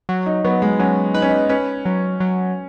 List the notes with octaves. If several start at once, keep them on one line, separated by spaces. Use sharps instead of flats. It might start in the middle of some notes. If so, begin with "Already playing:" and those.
F#3
D#4
F#3 B3
G#3
F#3 C#4
D#4 B4
C#4
D#4
C#4 B4
F#3
F#3